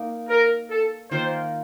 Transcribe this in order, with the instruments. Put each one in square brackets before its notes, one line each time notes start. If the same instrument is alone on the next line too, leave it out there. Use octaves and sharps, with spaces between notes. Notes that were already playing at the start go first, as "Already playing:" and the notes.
Already playing: [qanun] A#3 D#4
[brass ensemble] A#4
A4
[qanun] D#3 A#3 F4 A#4 [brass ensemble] C5